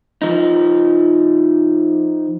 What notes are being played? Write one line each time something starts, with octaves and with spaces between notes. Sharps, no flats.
F3 D#4